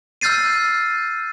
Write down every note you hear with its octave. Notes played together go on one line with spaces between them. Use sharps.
E6 F6 G6 A6 C7 D#7